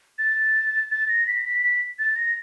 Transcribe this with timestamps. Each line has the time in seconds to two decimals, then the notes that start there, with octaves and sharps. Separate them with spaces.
0.18 A6
0.91 A6
1.08 A#6
1.27 B6
1.37 A#6
1.45 B6
1.62 B6
1.99 A6
2.16 A#6